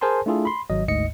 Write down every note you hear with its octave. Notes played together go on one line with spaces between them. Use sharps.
G#4 A#4 C5 G#5 A5 C6
A3 D4 E4 F4 G#4 A4
B5 C6
G#1 F#3 D#5
G1 D2 G#2 D#5 C#7